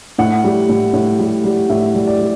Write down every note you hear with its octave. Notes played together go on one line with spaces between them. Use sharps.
A2 F#5
G3
A2
A2
G3
G3
A2 E5
G3
D5
G3